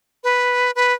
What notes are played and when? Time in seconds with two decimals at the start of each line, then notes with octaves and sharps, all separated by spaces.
0.24 B4
0.75 B4